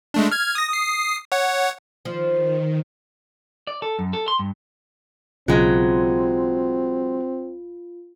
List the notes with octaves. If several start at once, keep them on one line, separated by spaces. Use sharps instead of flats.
G#3 A3 D4
F6 G#6
D#6 A#6
D#6 C7
C#5 F#5
D#3 F3
D5
A4
F#2
A4
C6
G2
B1 C#3 F#3 G#3 C4 F4